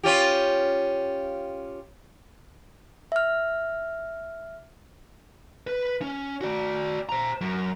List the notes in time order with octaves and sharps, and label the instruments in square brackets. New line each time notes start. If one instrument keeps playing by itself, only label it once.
[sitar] C#4 F4 G4
[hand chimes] E5 F6
[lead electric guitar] B4
C#4
F#4 D5
C5 A#5
F#2